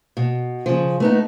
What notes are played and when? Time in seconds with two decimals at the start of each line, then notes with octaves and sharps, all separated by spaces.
0.17 B2
0.66 C#3 F3
1.00 A3 B3 D#4